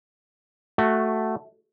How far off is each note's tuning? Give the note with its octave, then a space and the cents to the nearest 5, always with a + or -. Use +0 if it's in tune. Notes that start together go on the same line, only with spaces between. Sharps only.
A3 +0 F#4 +5